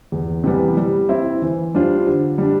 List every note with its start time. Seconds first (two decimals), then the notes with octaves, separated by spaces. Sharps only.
0.12 E2
0.44 C3 E3 G3 B3
0.77 G3
1.09 C4 E4
1.42 E3
1.74 G3 D4 F4 C5
2.07 D3
2.38 G3 D4